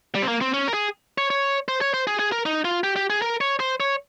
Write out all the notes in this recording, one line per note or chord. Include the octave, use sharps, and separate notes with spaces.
G3
C4
A#3
C4
C#4
A#4
G#4
C#5
C#5
C5
C#5
C5
G#4
G#4
A#4
D#4
F4
G4
G4
G#4
A#4
C#5
C5
C#5